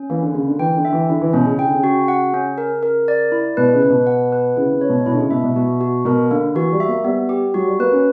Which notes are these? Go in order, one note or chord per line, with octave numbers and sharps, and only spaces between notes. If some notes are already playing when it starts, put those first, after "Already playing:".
Already playing: C#4
E3 A#3
D3
C#3 A#3
D3
E3 G5
D3
E5
E3
D3 E4
E3
B2 C#4
C#3
C#3 G5
D3
C#3
F#4
F#5
C#4
A#4
A#4
D5
E4
B2 B4
C#3
B4
B2
F#5
B4
C#3 E4
C#3
C#5
B2
B2 E4
D3
C#3
B2 E5
B2
B2 F#4
F#4
B2 A#4
D3 A#3
E3 F#4
G3
E5
A#3
G3 B3
G4
F#3 F#4
G3
A#3 B4
C#4